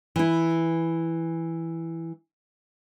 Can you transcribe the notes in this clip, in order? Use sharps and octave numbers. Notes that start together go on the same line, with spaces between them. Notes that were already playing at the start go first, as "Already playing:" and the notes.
E3 E4